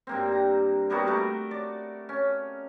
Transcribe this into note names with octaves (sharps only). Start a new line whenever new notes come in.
G2 A#3 C4
A#5
G3 A#3 B3 F#4
A3 A#4
D5
C#4